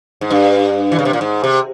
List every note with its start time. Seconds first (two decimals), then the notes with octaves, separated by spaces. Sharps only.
0.21 G#2
0.31 G2
0.92 E3
0.99 C#3
1.05 C3
1.13 A#2
1.21 G#2
1.44 C3